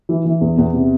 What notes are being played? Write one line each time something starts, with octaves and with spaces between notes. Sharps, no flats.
E3
E3
E2
E2
C3